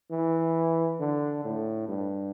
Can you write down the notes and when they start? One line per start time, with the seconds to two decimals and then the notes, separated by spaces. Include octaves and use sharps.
0.11 E3
1.00 D3
1.44 A2
1.88 G2